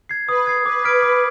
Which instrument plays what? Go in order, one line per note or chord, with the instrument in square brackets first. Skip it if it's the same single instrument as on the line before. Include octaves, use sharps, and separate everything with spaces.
[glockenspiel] G#6 C7
[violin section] B4 [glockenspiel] D#6
[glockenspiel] G#6 C7
[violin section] B4 [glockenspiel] D6
[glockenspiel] F6 G#6 B6 D7
D6